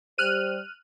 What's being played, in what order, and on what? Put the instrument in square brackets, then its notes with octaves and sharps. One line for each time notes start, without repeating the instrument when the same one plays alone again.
[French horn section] G3 G4 C5 [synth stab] F6 F#6 D#7